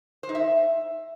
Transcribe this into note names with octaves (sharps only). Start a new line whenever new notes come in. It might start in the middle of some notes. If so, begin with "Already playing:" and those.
C5
D#4
E5